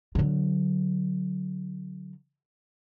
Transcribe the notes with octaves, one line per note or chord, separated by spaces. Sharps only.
D3 F#3